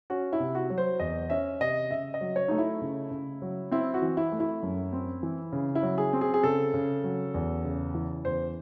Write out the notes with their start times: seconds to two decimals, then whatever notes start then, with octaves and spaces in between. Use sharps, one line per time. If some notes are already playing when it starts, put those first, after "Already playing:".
0.10 C#4 F#4
0.33 E4
0.40 C3
0.55 F#4
0.70 F#3
0.78 C5
1.00 E2 D#5
1.30 C#4 E5
1.60 C3 D#5
1.91 C#3 E5
2.14 D#5
2.21 F#3
2.36 C#5
2.48 A3 D#4
2.58 E4
2.81 C#3
3.11 C#3
3.42 F#3
3.71 C4 E4
3.94 F#4
4.02 E3
4.17 E4
4.32 A3
4.40 E4
4.63 F#2
4.93 C4
5.23 E3
5.52 C#3
5.75 E4
5.83 F#3
5.98 G#4
6.13 C4
6.21 G#4
6.34 G#4
6.43 C#3 A4
6.74 C#3
7.04 F#3
7.34 E2
7.64 C#3
7.94 E3
8.25 E2 C5